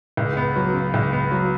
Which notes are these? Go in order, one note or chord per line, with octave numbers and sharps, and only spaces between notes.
C#2
B3
F#3
C#3
C#2
B3
F#3